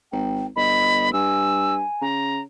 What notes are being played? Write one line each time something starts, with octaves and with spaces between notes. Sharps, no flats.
G#1 G5
G1 D#5 B5
G2 G#5 E6
C#3 A#5